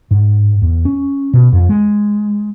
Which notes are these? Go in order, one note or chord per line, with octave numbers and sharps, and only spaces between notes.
G#2
E2
C#4
B2
F2
G#3